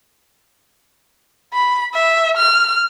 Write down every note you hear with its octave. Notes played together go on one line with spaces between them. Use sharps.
B5
E5
F6